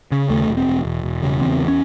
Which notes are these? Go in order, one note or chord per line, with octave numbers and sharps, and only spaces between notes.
C#3 C#4
D#2 A3
E1
C4
E1
E1
E1
C#3
E2 C4
C#4